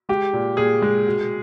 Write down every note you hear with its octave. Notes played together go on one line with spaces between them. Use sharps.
G#3 G4
A#2
A#2 G#4
G#3
B2